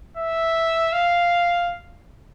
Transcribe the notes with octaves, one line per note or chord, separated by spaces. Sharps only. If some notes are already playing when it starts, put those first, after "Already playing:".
E5
F5